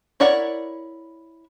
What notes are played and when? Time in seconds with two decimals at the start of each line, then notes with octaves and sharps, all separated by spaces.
0.20 E4 A#4 C#5 D5 F#5